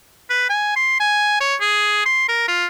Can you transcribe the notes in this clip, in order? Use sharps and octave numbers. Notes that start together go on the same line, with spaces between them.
B4
G#5
C6
G#5
C#5
G#4
C6
A#4
F4